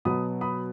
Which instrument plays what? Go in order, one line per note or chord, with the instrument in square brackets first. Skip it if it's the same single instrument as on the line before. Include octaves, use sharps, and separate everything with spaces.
[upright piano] B2 F#3 B3 B5 D#6
B5 D#6